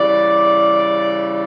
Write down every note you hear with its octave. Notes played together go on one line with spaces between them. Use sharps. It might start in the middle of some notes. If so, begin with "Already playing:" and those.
Already playing: C#3 E3 G3 D5